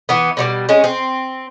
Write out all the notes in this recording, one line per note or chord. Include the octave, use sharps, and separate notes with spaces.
E3 B3
B2 D#3 G3
G#3 C#4
C4